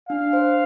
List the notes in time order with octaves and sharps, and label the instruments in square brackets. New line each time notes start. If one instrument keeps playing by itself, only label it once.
[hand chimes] D4 [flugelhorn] F5
[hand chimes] C5